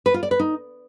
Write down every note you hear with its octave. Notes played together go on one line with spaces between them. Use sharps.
B4
F4
D5
B4
D#4